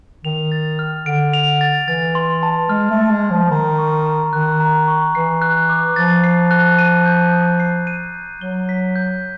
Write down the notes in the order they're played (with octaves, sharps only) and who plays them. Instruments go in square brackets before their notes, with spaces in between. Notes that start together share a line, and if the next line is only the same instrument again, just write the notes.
[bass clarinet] D#3 [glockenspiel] F7
[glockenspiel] A6
F6
[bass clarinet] D3 [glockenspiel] D7
[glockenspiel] F7
A6
[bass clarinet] E3 [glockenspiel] A6
[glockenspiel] C6
A5
[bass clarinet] G#3 [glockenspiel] F6
[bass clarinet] A3
[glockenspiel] A6
[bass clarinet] G#3
[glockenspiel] C6
[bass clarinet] F3
[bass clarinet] D#3 [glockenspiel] A#5
[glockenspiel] C#6
A#5
[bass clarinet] D#3 [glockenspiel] F#6
[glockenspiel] A#5
C#6
[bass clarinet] E3 [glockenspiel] C7
[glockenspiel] F#6
D6
[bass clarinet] F3 [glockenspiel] A6
[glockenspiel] C7
F#6
D#7
G6
D#6
C7
D#7
G6
[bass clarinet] F#3 [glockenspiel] G7
[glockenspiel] B6
G6